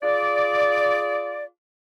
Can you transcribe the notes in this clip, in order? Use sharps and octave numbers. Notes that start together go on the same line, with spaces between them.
F4 G#4 D5